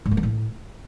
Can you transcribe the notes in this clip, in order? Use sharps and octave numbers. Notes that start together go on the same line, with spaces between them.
G#2
A#3
E3
A2